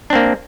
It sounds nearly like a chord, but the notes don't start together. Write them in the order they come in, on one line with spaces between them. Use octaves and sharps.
D4 C4 A#3